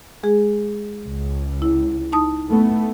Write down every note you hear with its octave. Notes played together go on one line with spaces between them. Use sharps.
G#3 G#4
C#2
E4
D#4 A5 D#6
A3 B3